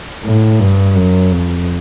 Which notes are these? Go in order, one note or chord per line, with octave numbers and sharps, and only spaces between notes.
A2
G2
F#2
F2